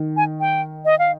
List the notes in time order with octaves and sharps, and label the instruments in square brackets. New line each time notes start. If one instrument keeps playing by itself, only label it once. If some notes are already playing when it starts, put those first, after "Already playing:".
Already playing: [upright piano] D#3
[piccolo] G#5
G5
D#5
F5